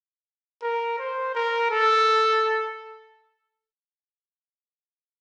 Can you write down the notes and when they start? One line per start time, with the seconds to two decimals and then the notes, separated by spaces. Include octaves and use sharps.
0.63 A#4
0.99 C5
1.35 A#4
1.71 A4